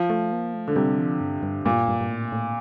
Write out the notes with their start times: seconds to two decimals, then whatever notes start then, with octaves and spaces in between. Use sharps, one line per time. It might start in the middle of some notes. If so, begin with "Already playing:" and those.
Already playing: F3
0.10 A3
0.32 A#3
0.54 A3
0.68 D3
0.76 C3 G3
0.98 F3
1.20 G2
1.43 G2
1.65 G2 A#2
1.88 G2
2.00 G2
2.10 A2
2.32 A2